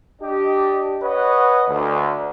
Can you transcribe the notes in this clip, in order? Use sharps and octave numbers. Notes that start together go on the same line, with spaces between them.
D4 G4 D#5
B4 C#5 D#5 F#5
D2